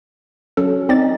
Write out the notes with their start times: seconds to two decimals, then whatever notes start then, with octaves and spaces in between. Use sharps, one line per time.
0.57 F#3 C#4 A4
0.89 C4 D#4 D5 A6